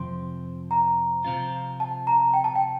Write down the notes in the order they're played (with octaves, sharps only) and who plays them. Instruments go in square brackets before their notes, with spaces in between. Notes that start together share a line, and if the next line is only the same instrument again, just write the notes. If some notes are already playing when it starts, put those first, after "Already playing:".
Already playing: [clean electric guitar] F2 C3 F3 C4 [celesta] C6
[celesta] A#5
[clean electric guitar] C3 F3 C4 F4
[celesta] A5
A#5
G5
A5
G5